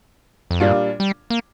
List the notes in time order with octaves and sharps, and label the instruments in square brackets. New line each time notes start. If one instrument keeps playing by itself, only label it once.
[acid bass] F2
[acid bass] G2 [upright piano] A#2 G3 D4 F4
[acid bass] G3
A#3